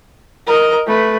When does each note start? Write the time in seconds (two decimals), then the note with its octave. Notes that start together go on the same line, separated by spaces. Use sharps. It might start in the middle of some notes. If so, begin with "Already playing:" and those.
0.47 A#4 D#5
0.87 A3 B4